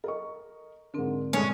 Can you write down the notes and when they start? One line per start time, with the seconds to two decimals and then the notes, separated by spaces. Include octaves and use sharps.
0.04 A4 A#4 D#5 C#6
0.94 G#2 D3 C4 D4 A#4
1.33 G2 A#2 G#3 A3 C#4